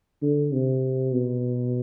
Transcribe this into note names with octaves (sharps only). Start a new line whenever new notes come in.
D3
C3
B2